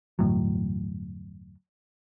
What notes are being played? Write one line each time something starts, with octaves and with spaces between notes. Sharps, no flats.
G1 E2 A2 F#3